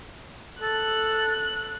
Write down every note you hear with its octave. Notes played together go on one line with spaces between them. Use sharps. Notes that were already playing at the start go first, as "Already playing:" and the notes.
A4 F#6